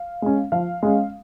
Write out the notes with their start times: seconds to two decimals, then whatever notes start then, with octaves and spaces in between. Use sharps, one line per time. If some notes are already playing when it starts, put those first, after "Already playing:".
Already playing: F5
0.22 G#3 C#4
0.52 F3 F5
0.83 G#3 C#4